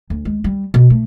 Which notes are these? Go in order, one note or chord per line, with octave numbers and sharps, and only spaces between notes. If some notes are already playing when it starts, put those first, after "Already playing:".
D2
G#3
G3
B2
A3